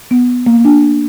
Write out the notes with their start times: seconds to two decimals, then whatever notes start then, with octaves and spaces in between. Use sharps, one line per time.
0.11 B3
0.46 A#3
0.65 D4